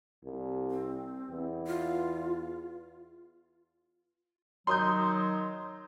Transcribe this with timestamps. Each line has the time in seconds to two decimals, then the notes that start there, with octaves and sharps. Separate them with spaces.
0.24 C2
0.71 C4
1.30 E2
1.67 F4
4.67 D#3 F#3 F#4 C#5 A#5 C6 D#6 G6